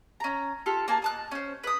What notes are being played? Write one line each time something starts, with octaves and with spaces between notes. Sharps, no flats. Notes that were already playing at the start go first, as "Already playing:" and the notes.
C#4 A#5
F4 G4 A4
A#3 G#5 A5
D#5 A5 F#6
C#4 C5
B4 D#6